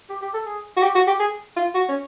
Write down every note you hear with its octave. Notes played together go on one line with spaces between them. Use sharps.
G4
G4
A4
G#4
F#4
G4
F#4
G4
G#4
F4
F#4
C#4